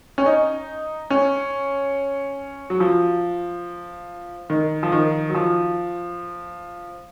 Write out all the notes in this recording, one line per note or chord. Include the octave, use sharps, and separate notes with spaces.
C#4
D#4
C#4
F#3
F3
D#3
F3
D#3
F#3
F3